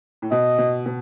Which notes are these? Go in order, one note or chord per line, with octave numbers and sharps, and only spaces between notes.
A2
B2 D#5
B2
B2